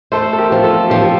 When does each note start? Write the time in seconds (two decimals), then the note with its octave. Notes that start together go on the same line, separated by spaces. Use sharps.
0.12 A3 A4 C5
0.33 A4
0.38 G4 A#4
0.52 F3
0.64 F4 A4
0.90 F3 G4
1.01 A4